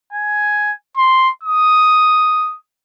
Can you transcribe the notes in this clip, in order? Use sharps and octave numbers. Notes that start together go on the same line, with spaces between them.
G#5
C6
D#6